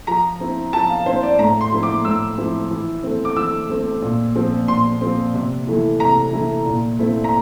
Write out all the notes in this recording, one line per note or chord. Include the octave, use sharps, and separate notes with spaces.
F3 A#5
C4 E4
F3 A5
F5
C4 E4 C5
D5
A2 A#5
C6
F3 C4 E4
D6
A2 E6
F3 C4 E4
E3
A3 C4
D6
E3 E6
A3 C4
A#2
F3 C4
A#2 C6
F3 C4
C3
E3 A3 E4
C3 A#5
E3 A3 E4
A#2
A3 C4 E4
A#5